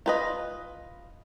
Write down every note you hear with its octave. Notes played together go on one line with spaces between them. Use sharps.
F4 B4 D#5